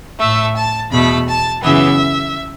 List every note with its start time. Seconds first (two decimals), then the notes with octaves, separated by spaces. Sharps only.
0.20 A2 A3 E5
0.56 A5
0.91 E2 B2 A3 B5
1.27 A5
1.62 F#2 C#3 E3 B3 E5